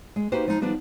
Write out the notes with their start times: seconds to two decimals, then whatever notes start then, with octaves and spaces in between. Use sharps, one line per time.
0.16 G#3
0.32 A#3 D#4 F#4 G4 B4 C5
0.47 F3 G#3 D#4
0.61 D#3 F3 G3 B3 D4